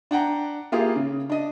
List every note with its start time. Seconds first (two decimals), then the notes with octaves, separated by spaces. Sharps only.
0.11 D4 F#5 G5 A#5
0.72 A#3 E4 F4 G4 G#4
0.96 C#3
1.30 D4 D#5